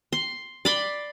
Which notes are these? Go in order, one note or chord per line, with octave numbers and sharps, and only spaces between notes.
C6
D5 B5 C6